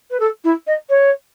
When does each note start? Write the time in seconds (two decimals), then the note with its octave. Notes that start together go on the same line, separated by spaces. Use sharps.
0.10 B4
0.20 A4
0.44 E4
0.67 D#5
0.89 C#5